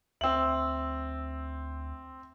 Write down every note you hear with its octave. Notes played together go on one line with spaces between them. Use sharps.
D2 C4 E5 E6 F#7